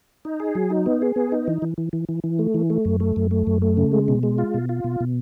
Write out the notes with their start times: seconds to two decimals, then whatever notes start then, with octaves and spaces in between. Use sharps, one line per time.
0.25 D#4
0.40 G#4
0.55 F#3
0.70 D#4
0.86 B3
1.02 G#4
1.16 B3
1.32 D#4
1.48 E3
1.62 E3
1.78 E3
1.93 E3
2.09 E3
2.24 E3
2.39 A3
2.54 E3
2.70 A3
2.85 F#2
3.00 A3
3.16 F#2
3.31 A3
3.47 F#2
3.62 A3
3.77 C#3
3.92 G#3
4.08 B2
4.23 G#3
4.38 F4
4.54 B2
4.69 F4
4.84 B2
5.00 B2